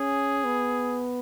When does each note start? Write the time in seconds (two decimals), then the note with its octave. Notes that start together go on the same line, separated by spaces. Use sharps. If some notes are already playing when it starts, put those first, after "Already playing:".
Already playing: C#4 G#4
0.44 B3